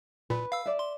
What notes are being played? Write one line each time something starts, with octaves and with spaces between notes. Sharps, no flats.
A#2 B4
F5 E6
D5 E5
C6